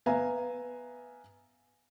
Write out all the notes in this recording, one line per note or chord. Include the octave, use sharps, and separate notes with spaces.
B3 E5 F5 G#5 A#5